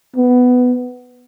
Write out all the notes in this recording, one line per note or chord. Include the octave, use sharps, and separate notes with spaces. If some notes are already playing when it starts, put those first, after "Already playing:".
B3